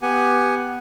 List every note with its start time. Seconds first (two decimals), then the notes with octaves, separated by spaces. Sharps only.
0.02 B3 G4 F#5 G#5